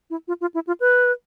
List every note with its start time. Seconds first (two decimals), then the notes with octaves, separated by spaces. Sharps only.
0.10 E4
0.28 F4
0.41 F4
0.54 E4
0.67 F4
0.80 B4